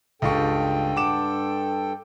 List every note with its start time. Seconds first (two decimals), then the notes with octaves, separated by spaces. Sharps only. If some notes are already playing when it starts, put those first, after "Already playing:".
0.22 C#2 G2 F4 A4 G5 C#6
0.96 F#5 D6 E7